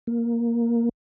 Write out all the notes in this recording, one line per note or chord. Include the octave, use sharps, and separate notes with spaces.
A#3